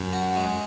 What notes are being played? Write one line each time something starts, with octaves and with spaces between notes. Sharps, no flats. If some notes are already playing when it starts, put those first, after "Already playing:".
Already playing: F#2
F#4
G#3